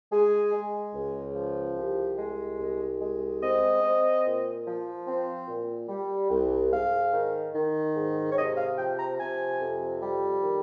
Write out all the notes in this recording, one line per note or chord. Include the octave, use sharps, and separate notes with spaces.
G#3 G#4
G#3
C#2
F3
C2 G4
G#3
C2
G#3
C4 D#5
C4
A#2
F3
C4
A#2
G3
C2
G#2 F5
D#3
D#3
G#2
C#5
C3 D#5
F5
F3 G5
A#5
C3 G#5
F2
G3
D#3